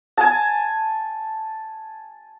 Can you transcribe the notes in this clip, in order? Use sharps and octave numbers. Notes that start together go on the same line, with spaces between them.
G#5 A5